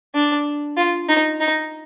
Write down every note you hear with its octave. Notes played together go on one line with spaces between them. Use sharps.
D4
F4
D#4
D#4